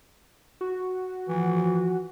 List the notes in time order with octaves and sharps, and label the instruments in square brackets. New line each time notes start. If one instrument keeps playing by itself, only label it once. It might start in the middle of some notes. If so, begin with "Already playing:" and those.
[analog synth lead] F#4
[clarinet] E3 [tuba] F3